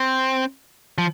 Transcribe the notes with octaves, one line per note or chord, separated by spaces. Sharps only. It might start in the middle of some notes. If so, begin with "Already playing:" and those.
Already playing: C4
F3